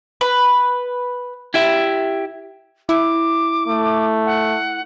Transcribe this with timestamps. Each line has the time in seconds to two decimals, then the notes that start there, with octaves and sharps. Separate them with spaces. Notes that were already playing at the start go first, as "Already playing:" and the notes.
0.21 B4
1.54 E4 G4 E5
2.89 E4 D6
3.68 A3
4.26 F#5